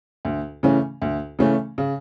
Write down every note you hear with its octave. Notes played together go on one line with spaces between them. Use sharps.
D2
C#3 E3 A3 C#4
D2
C#3 E3 A3 C#4
C#3